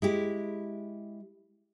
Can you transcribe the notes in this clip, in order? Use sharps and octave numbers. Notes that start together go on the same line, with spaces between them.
G#3 E4 G4